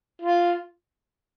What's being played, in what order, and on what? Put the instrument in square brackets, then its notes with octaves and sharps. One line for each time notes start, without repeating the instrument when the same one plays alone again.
[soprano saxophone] F4